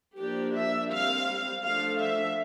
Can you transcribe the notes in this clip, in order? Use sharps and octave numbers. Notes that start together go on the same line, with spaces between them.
F3 A#3 D4 G4
E5
G3 C4 F5
F3 A3 D4 F5
E5